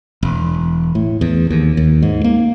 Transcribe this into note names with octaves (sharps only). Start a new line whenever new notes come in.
E1
A2
E2
D#2
D#2
G#2
A#3